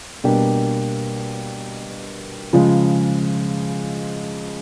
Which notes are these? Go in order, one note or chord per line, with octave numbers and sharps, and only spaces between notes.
B2 G3 A#3 D4 G4
C#3 F3 G#3